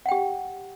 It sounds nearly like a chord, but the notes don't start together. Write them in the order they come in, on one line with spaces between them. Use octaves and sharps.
F#5 G5 G4